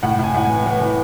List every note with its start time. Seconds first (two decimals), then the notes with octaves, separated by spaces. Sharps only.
0.03 A2 F#5
0.19 A2 G#5
0.34 A2 F#5
0.45 G#5
0.50 E3
0.66 E3
0.81 E3